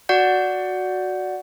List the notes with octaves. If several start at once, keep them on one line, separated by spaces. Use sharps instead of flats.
F#4 D5 F#5 G6